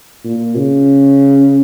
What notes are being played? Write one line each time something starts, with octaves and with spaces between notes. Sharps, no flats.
A#2
C#3